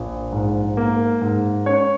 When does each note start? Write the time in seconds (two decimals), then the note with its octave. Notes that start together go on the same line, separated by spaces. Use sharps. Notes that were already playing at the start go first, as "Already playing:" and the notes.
Already playing: A#1
0.32 G#2
0.77 A#3
1.21 G#2
1.66 C#4 C#5